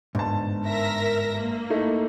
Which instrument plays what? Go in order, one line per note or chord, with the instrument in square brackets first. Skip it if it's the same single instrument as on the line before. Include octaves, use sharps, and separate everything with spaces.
[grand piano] G1 A5 [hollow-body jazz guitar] G#2
[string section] A#4 E5 A#6
A#3
[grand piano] A3 D#4 E4